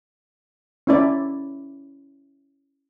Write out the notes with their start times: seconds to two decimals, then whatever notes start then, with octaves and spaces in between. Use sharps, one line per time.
0.87 C#4 E4 D5